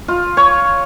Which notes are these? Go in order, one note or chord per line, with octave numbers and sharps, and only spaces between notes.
F4
C#5